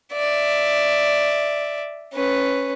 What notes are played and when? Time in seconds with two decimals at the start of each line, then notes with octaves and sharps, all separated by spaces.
0.13 D5 E5
2.14 C#4 B4